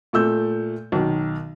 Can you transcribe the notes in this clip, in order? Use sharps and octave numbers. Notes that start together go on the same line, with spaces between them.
A#2 A3 E6 G6
B1 D#3